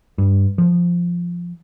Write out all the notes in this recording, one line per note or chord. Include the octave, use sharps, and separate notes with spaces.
G2
F3